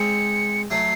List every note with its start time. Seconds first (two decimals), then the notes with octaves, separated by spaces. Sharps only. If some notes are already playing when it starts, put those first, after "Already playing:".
Already playing: G#3 C4 C#7
0.71 F#3 A3 C7